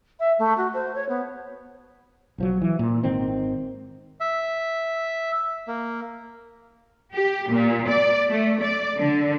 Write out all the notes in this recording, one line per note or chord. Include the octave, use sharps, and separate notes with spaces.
E5
A3
F#4
C5
C#5
B3
B1 F3 F#3
E3
A#2
G#1 D#3 C4
E5
A#3
G4
A#2
D5
A3
D5
D3